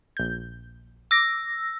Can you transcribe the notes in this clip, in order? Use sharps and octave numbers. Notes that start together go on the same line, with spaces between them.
A#1 G6
D6 E6 A#6